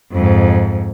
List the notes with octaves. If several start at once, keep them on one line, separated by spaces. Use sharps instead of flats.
F2 G#2